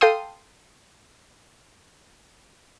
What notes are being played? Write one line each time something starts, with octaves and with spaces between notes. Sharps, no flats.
A4 F5 G5 C6 D#6